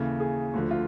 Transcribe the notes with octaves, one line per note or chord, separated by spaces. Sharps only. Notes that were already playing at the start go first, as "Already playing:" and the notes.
Already playing: D#2 C#3 E3 A4
G#4
D2 D3 F3
F4